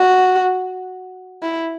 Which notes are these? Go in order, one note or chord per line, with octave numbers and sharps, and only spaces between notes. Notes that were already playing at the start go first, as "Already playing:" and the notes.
Already playing: F#4
E4